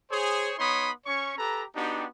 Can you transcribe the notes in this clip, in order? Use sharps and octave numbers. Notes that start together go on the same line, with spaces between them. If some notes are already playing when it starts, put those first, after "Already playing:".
G#4 C5 C#5
B3 D#4 C#5 B5 C6 D#6
C#4 C#5 C#6
G4 A4 B4 A#5
B3 D4 D#4 F#4 G4